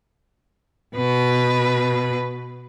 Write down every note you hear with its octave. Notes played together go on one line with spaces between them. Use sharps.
B2 B4